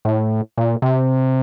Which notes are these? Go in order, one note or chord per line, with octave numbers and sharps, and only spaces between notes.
A2
A#2
C3